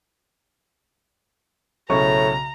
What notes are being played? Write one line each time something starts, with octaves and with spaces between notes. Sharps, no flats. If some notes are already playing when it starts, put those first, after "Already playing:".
B1 A2 C#3 A#5 C#6